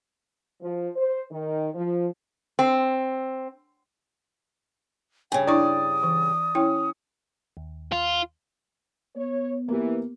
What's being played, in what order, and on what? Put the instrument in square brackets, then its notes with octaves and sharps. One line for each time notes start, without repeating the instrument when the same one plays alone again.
[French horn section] F3
C5
D#3
F3
[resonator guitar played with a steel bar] C4
[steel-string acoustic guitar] G2 C#3 [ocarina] G5 [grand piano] G#5
[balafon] D4 E4 C#6 [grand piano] D5 [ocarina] D#6
[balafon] E3
[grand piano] C#4 [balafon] E4 G5
[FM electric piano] D#2
[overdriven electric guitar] F4
[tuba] B3 [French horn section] C#5
[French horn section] E3 [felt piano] A#3 G4